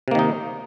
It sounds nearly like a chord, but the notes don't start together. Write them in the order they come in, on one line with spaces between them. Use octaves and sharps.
C3 A#3 D#3 D#4